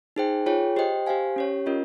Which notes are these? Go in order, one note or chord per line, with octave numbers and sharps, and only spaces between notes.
D#4 G#4 C5 G5
F4 G#4 C#5 G5
G4 C5 D#5 G5
G4 C5 F5 G#5
C#4 G4 C#5
C#4 F4 A#4 D#5